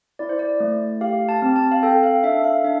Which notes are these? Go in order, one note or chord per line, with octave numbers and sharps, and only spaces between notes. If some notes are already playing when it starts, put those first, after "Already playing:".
E4 D5
C5
D5
A3
G4 F5
A5
C4
A5
F5
A4 G5
F5
D4 E5
F5
D4 E5